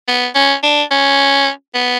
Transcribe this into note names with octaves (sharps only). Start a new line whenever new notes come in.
B3
C#4
D4
C#4
B3